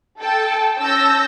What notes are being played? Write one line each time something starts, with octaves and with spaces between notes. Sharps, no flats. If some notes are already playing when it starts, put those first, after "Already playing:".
A4 G5 A5
C#4 A5 E6 G6 A#6